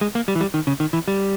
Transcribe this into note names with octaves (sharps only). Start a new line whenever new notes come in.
G#3
A#3
G3
E3
G3
D#3
C#3
D#3
E3
G3